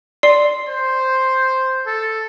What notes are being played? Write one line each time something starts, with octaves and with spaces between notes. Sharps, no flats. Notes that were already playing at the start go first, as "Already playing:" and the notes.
D5 C6 C7
C5
A4